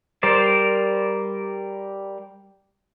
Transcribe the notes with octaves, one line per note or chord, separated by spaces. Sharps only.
G3 A#4 C5 D5